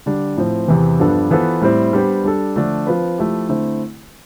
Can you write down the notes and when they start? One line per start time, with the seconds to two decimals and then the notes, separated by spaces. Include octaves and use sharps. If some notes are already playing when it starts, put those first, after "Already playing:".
0.06 D3 G3 D4
0.37 A2 F3 C4
0.68 E2 C3 E3
0.99 G2 F3 B3 D4 A4
1.31 E3 B3 F4 A4 C5
1.61 A2 G3 C4 E4
1.93 G3 B3 D4 G4 C5
2.24 G3 D4 A4
2.56 D3 F3 A3 D4
2.87 F3 C4 F4 B4
3.18 F3 A3 E4 G4
3.49 D3 A3 C4 E4